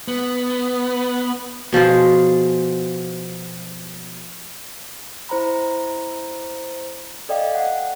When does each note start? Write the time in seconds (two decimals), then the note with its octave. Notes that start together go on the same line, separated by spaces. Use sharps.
0.08 B3
1.73 B2 F3 F4 G#4
5.29 E4 C5 A#5 B5
7.29 A4 D5 D#5 F5 G5
7.55 F#5